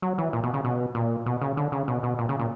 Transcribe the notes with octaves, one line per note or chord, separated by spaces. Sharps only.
F#3
E3
A#2
B2
C#3
B2
A#2
B2
C#3
D3
C#3
B2
B2
A#2
C#3
A#2